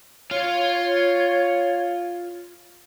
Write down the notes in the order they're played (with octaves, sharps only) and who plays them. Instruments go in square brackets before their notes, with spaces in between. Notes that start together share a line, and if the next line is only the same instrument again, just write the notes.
[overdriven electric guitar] F4 F5 [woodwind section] C#5